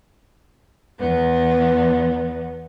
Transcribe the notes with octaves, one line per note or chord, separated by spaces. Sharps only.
E2 B3